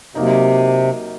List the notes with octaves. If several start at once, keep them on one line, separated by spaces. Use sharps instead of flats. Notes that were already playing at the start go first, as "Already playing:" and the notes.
C3 F#3 A#3 D#4